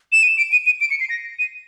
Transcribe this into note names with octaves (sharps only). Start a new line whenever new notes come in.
E7
D#7
D7
D#7
D#7
D7
C#7
C7
A#6
D#7